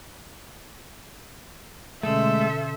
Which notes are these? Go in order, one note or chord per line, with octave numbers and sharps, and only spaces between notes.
B2 D3 G#3 A3 C#4 A4 C5 E5